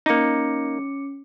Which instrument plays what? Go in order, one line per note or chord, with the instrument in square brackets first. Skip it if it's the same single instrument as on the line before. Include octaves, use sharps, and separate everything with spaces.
[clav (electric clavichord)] A#3 D#4 [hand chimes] C#4 D6 C#7